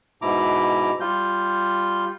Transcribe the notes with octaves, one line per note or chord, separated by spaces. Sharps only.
G#2 B2 E4 A#5 D6
G3 F4 G6